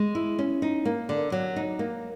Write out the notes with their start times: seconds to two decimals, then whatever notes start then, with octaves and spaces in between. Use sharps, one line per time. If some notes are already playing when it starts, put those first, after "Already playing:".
Already playing: G#3
0.15 E4
0.39 C#4
0.62 D#4
0.85 A#3
1.09 D3
1.32 F#3
1.56 D#4
1.79 A#3